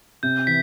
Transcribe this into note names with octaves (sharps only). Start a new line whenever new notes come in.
C3 G6
E3 B6